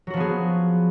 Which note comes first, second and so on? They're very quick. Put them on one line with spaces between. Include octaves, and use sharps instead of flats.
F#3 F#4 F3 B3 G#4